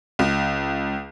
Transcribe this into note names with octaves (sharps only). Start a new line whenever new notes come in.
C#2